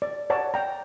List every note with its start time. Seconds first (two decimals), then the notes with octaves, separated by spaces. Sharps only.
0.02 D5
0.30 C#5 D5 F#5 A5 A#5
0.54 G5 A#5